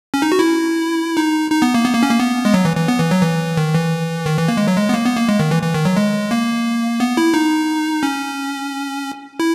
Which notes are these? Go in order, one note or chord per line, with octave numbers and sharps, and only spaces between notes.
C#4
D#4
F#4
E4
D#4
D#4
B3
A#3
B3
A#3
C#4
A#3
B3
G#3
F#3
E3
E3
B3
E3
F#3
E3
D#3
E3
D#3
E3
A#3
G#3
F#3
G#3
B3
A#3
B3
A#3
G#3
D#3
E3
E3
D#3
F#3
G#3
A#3
B3
E4
D#4
C#4
E4